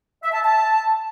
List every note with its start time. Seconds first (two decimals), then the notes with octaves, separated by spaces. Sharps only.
0.23 E5
0.33 A5
0.44 A5